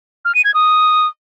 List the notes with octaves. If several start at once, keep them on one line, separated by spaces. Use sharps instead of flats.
F6
D#7
G#6
D#6